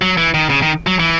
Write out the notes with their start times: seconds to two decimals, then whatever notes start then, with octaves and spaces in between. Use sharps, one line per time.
0.02 F#3
0.17 E3
0.34 D#3
0.50 C#3
0.62 D#3
0.87 F#3
0.99 E3